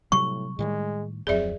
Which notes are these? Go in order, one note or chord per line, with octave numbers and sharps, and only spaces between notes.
A2 C3 F#3 G3 C#6
A2 D#3 G3 G#3
D1 F2 F#3 C4 G#4 D5 E5